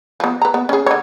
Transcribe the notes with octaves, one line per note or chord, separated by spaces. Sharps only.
F3 B3
B4 A#5
B3
C#4 G#4
D3 C#5